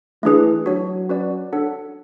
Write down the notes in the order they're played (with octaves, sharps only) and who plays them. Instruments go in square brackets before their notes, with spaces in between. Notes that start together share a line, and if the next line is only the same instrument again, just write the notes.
[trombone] E3 [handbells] A3 D4 G#4 B4
[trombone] F#3 [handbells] D4 F#4 C#5
[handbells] C#4 F#4 B4 D5
D4 A4 C#5 F#5